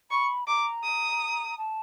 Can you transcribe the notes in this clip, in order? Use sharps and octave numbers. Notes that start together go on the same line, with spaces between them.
B5 C#6
A#5 D6
D#6
A5